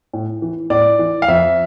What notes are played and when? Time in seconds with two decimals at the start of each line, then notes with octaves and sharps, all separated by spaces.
0.13 A2
0.42 E3
0.70 A2 D5
0.99 E3
1.22 F5
1.28 F2 E5